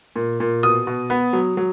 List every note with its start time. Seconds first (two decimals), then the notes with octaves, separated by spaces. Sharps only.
0.16 A#2
0.40 A#2
0.63 B2 D#6
0.87 B2
1.10 B3
1.33 F#3
1.57 F#3